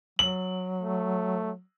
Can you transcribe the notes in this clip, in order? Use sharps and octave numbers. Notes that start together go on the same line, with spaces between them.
F#3 F#7
A3